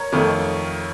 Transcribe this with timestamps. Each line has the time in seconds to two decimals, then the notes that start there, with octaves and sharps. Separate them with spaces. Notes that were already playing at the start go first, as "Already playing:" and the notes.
Already playing: A#4 C#5
0.12 F2 D#3 A3